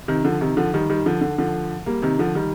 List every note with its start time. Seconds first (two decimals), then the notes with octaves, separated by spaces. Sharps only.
0.08 C3 D#3
0.25 D3 F3
0.41 C3 D#3
0.57 D3 F3
0.73 D#3 G3
0.90 D#3 G3
1.06 D3 F3
1.21 D3
1.38 D3 F3
1.86 G3 A#3
2.02 C3 D#3
2.19 D3 F3
2.35 D#3 G3